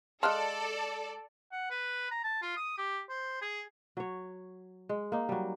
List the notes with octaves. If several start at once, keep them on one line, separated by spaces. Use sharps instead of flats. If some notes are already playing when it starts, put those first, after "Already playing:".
G#3 A4 D5 F5 A5 C6 F6 F#6
F#5
B4
A#5
A5
F4
D#6
G4
C5
G#4
F#3 C#5
G#3
A#3 D#4
F#3 G3